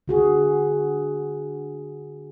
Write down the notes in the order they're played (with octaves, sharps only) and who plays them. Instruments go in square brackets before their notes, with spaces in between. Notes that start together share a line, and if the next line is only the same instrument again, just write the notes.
[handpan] D3 F#4 G#4